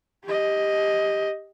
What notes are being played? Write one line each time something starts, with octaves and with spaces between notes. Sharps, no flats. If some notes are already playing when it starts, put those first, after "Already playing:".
G4 D#5